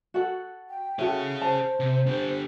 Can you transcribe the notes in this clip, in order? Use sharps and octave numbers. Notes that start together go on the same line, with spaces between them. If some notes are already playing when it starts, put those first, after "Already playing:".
F#4 A4 F#5
G5
E4 F#4 G#4 A4 C#5
C5 A5
C3
D3 G4